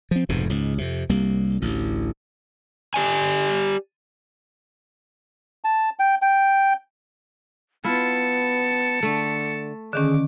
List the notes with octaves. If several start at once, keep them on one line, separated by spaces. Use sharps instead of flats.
F3 C4
F1 F2 G#2 B2
C#2 G#2
F2 C3
C2 G3 A#3
A1 D2
G4 D5 G#5
A5
G5
G5
B3 E4 F4 A5 C#7
D3 A3
D3 D#3 C#4 G#4 D6